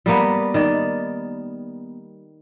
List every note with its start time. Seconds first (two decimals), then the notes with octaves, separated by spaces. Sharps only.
0.06 G3 A#3 B3
0.54 D#3 D5